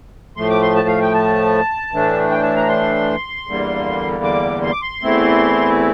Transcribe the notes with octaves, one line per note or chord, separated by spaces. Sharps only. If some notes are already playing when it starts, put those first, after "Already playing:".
A2 F3 A3 C6
D6
C6
A5
F5
G5
A5
A2 E3 A3 D4
G5
A5
A#5
C6
E2 D3 G3 A#3
D6
C6
D6
C6
E2 E3 A3 C4 E4